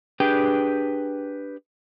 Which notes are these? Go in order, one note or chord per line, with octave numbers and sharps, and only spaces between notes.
D4 G4 G#4 B4 G5